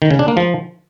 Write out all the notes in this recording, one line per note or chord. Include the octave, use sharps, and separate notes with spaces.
D#3
C#3
D4
A#3
F3